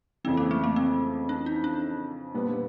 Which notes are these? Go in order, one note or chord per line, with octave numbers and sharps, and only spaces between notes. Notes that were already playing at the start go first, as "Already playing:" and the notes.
F2 C#3 E3 C4
A#3
A3
A#3
C4
D4
D#4
D4
A#2 G3 B3 D4